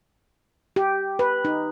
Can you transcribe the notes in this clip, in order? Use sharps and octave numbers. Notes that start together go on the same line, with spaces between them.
G4
B4
D#4